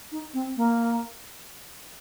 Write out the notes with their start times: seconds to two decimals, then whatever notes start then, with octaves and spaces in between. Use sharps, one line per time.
0.12 D#4
0.34 C4
0.57 A#3